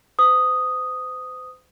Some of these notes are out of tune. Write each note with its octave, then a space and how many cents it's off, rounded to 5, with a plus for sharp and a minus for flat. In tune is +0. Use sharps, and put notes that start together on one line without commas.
C5 -40 D#6 +0